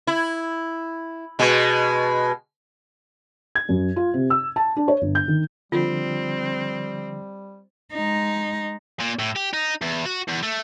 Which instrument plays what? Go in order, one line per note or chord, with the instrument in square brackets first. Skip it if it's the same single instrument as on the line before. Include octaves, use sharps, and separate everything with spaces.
[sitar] E4
B2 G#3
[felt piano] G#6
F#2
F4
C3
E6
A5
D4
C#5
G1
G6
D#3
[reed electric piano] D3 F3 [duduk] G3 [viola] C4 [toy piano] F4
[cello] G#3 D#4
[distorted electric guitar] A#2
A2
G4
D#4
E2
F#4
E2
A3